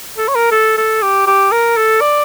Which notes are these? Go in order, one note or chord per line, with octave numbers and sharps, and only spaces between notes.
A4
C#5
A#4
A4
A4
G4
G4
A#4
A4
D5